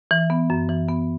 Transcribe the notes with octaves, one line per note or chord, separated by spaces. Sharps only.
E3
B3
F#2
E3
B3